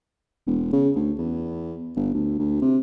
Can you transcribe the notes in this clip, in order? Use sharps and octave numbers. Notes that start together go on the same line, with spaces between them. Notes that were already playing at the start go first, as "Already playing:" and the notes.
E1
C#3
D2
E2
G1
D2
D2
C3